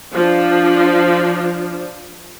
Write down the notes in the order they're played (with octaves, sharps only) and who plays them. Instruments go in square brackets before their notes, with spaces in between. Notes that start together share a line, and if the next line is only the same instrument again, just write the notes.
[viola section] F3 D4